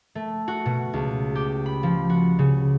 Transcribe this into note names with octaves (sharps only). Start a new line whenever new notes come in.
A3
F#4
B2
C#2
G4
B5
F3
F#4
C#3